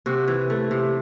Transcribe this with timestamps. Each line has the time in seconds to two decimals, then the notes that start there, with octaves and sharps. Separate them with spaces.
0.06 C3 F#4
0.28 E3
0.50 A3
0.71 C3